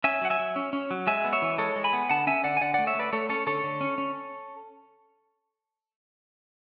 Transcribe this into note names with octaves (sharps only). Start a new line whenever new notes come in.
C#4 E5 G#5
F#3 F#5
E5 G#5
F#3
C#4
C#4
F#3
G#3 E5 G#5
B3
C#5 E5
E3
G#3 A4 C#5
G#3
G#5 B5
B3
D3 F#5 A5
C#4 E5 G#5
D3 D5 F#5
G#5
D3 D5 F#5
A3 D5 F#5
C#5 E5
A3 B4 D5
A3 A4 C#5
C#4 A4 C#5
D3 A4 C#5
D3
C#4
C#4